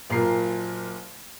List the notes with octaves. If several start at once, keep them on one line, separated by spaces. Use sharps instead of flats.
F#1 A#2 A#4 C7